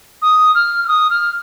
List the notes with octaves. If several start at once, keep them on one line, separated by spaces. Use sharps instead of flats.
D#6
F6
F6
D#6
F6